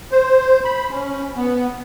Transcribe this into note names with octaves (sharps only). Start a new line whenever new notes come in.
C5
B5
C#4
B3